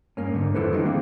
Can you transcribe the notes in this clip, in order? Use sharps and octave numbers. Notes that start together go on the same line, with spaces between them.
G2 A#3 C#4
G#2 D3
F2 E4 A4 B4 C5
D#3 F3 G3 D4 D#4
A#3 C4 G#4 F5